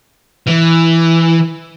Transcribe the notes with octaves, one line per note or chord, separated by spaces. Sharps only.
E3